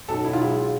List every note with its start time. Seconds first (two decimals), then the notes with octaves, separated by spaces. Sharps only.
0.08 B1 A4
0.24 B1 E4
0.33 F4
0.41 G#3 E4
0.58 F4